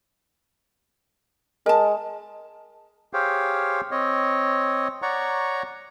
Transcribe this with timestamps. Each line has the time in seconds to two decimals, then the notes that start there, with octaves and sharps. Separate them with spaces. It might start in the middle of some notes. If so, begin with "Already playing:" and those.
1.66 G#3 A#4 A5
3.13 G4 G#4 C5 C#5 F5 G5
3.91 C4 C#5 D#5
5.02 C#5 D5 F#5 A#5 C#6